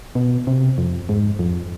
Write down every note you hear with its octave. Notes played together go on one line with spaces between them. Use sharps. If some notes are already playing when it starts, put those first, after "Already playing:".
B2
C3
F2
G#2
F2